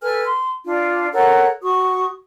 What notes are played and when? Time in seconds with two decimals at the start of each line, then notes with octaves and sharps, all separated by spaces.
0.02 A4 B4 G#5 F6
0.25 C6
0.65 D4 F4
1.13 A4 A#4 C#5 F#5
1.62 F#4 C#6 D#6